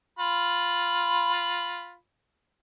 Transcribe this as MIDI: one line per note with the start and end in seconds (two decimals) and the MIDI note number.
0.19 1.96 65
0.19 1.96 83